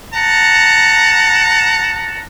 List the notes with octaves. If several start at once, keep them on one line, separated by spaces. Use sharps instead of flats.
F#5 A5 A#5